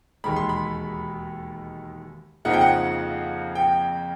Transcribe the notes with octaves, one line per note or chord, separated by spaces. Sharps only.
E1 D#2 D#3 G#3 B5
C6
B5
F2 C#3 F3 A#3 D#4 F#5
G5
F#5
G5